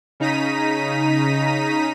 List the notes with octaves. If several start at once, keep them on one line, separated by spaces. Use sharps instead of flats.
C#3 D#4 A#5 B6 D#7